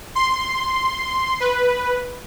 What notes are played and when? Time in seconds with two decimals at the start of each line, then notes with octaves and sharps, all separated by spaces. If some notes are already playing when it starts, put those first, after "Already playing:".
0.15 C6
1.40 B4